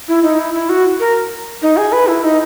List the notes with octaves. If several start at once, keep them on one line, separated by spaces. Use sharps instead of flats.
E4
D#4
E4
E4
F#4
A#4
D#4
G#4
B4
E4
D#4